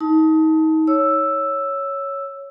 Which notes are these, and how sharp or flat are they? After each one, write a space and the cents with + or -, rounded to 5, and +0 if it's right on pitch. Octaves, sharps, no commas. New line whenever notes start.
D#4 +30 A5 +0
C#5 +0 E6 +5